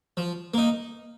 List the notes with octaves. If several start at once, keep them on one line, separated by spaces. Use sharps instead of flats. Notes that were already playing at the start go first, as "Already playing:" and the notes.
F3
A#3 D#4